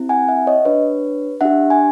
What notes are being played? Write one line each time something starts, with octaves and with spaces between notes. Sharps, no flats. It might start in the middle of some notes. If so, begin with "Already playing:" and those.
Already playing: C4 E4 G4
F#5 G#5
E5 F#5
C#5 D#5
D4 G4 B4 C#5
D4 G4 E5 F#5
G#5